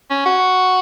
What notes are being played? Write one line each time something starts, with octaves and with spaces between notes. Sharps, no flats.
C#4
F#4